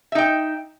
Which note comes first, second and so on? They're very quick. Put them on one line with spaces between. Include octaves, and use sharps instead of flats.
E5 D#4 G5